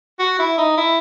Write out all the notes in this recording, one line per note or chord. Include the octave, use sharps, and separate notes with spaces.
F#4
E4
D#4
E4